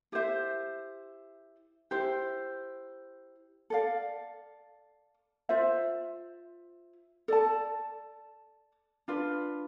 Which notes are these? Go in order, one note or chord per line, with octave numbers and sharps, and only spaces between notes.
E4 G4 C5 E5
E4 G4 C5
A4 D5 F5
F4 C5 E5
A4 D5 A5
D4 F4 B4